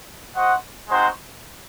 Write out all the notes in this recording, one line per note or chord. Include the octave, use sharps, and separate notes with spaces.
F#4 C5 D#5 F#5
G#3 C4 D#4 F#4 C5